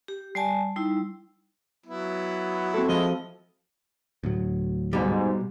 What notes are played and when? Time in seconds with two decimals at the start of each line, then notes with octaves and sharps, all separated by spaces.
0.08 G4
0.35 G3 D5 G#5 A5
0.76 G3 D#4 E4
1.86 F#3 B3 E4
2.74 C4 F#4 A4
2.88 F3 G#3 E4 D#5
4.23 D2 A2 F#3
4.93 G#2 B2 G3